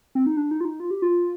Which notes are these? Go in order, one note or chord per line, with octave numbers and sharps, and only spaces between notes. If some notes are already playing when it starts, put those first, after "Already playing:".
C4
D#4
D4
D#4
F4
D#4
F4
G4
F4